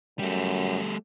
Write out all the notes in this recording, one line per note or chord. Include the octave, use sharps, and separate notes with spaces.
F#2 G3 A3